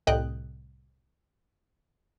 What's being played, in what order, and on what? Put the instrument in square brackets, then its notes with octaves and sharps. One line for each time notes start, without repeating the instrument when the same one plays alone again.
[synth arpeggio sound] C2 A2 D#5 G5 F#6